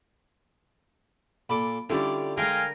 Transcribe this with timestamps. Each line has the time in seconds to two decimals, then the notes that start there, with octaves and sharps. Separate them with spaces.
1.49 A#2 A4 B5 D6
1.89 D3 G3 C#4 E4 F4 G4 A4 D5
2.37 G#3 A#4 F5 G5 G#5 A#5